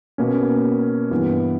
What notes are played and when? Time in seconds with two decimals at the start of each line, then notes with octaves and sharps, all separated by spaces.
0.18 B2 A#3 C#4
1.11 G2 E3 B3